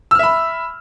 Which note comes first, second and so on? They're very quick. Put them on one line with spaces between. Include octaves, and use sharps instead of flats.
E6 F6 E5 B5